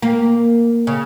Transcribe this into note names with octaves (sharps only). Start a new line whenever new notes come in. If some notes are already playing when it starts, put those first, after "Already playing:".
A#3
C#3